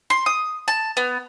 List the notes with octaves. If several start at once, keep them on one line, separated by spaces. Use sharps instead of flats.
C6
D#6
A5
B3